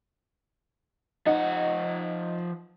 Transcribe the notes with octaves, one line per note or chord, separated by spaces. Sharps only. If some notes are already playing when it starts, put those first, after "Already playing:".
F3 D#4 F#5